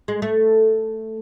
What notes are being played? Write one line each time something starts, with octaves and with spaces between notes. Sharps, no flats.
G#3
A3